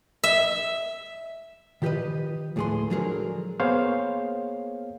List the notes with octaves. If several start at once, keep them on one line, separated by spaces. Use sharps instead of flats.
E5
D#3 F3 G4 A4 B4 D#5
D2 A2 G#3 G#4 B4 C6
D3 F3 F#3 G#3 G#4 A#4
A#3 B3 G#4 C5 C#5 F5